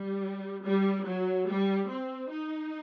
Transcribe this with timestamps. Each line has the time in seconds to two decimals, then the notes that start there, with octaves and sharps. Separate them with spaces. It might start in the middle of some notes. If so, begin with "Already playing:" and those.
Already playing: G3
0.64 G3
1.07 F#3
1.48 G3
1.90 C4
2.31 D#4